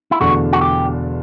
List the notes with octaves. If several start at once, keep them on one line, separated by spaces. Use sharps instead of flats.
E4
E1 E2 D3 A3 D4 F#4
F#4
G4